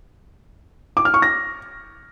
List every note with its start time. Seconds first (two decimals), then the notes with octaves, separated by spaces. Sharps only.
0.97 D6
1.05 F6
1.14 C#6
1.22 A#6